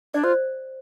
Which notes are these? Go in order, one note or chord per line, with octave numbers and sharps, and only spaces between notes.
D4 D5
F4 C5